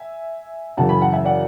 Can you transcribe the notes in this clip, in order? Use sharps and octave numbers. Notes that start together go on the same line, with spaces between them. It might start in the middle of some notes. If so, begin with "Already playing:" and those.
Already playing: E5 G#5
F#2 C#3 E3 F#5 A5
G#5 B5
F#5 A5
E5 G#5
D5 F#5